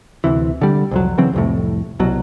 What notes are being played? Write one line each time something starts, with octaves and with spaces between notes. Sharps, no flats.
D2 C3 E3
D3 G3
C2 F2 F#3
C#3 E3 F#3 C4
C2 F2 A2
C2 B2 F#3